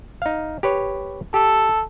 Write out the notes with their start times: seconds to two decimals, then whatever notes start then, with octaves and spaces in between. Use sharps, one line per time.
0.22 D#4 F5
0.63 G4 B4 C#5
1.34 G4 A4